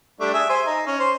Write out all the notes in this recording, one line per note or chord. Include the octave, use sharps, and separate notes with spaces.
G3 A3 D4
G#4 E5
C5 G#5
D#4
C#4
C5